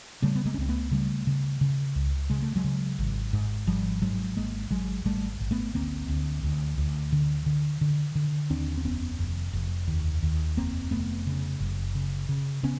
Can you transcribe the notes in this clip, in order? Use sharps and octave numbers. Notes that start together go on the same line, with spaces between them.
C#3 G3 A3
B3
G#3 A#3
C#4
C#2 C4
A3 B3
C#3 G3 A3
C#3
C#3
C#2
C#3 G#3
A3
F#3 G#3
C#3
G#1
G#2
G#1 F3 G3
G#2 F#3 G#3
G#1 G#3 A#3
G#1 F#3 G#3
G#1 G3 A3
G#1
A3 B3
D2 A#3 C4
D2
D2
D2
D3
D3
D3
D3
D#2 C4 D4
C4
F1 B3 C#4
F1
F1
D#2
D#2
F1 A#3 C4
F1 A3 B3
C#3
F#1
C#3
C#3
C#3 B3 C#4